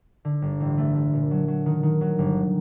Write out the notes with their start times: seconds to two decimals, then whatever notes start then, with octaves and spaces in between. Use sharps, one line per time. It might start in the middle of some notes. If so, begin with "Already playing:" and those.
0.25 D3
0.42 G1
0.60 A1
0.78 A3
0.95 A3
1.13 A#2
1.31 F#3
1.48 F#3
1.66 D#3
1.83 D#3
2.01 F#3
2.19 G1